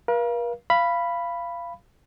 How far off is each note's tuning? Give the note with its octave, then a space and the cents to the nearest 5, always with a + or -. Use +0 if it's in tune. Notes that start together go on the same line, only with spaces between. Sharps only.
A#4 +45 F5 -20
F5 -20 B5 +0